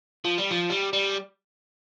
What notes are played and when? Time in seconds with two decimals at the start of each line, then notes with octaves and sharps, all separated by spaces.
0.25 F3
0.38 G3
0.51 F3
0.70 G3
0.93 G3